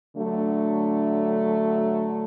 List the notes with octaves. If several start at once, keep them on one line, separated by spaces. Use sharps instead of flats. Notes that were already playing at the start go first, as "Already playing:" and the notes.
D3 F#3 A3 D4